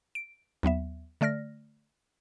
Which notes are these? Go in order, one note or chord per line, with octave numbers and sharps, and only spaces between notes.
D7
D#2 F#3 B3 E5
D3 A3 D5 F6 A#6